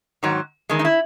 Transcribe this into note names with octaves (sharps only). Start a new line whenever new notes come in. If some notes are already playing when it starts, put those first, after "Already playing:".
G#2 D#3 F#3
E2 D#3 G#3
D#4
E4